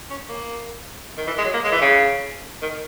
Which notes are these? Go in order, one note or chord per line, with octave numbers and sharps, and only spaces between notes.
C#4
A#3
D#3
E3
G#3
F#3
A#3
G#3
E3
C#3
D#3